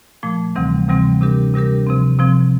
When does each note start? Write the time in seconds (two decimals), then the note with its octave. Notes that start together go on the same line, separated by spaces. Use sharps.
0.23 A#2 F3 A3
0.56 D2 C3 E3 G3 C4
0.88 D2 C3 E3 G3 C4
1.21 C3 G3 D4 G4 A#4
1.54 C3 G3 D4 G4 A#4
1.86 C3 F3 C4
2.19 C3 F3 C4